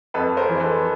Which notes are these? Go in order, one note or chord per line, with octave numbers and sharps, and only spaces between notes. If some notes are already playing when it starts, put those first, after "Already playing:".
F2 A4 B4
A#4 C5
E3
A4 B4